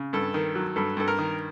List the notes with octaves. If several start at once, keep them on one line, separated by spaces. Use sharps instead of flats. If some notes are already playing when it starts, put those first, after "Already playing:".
Already playing: C#3
G2 A4
D#3
F#3
G2 A4
G2 A4
A#4
D#3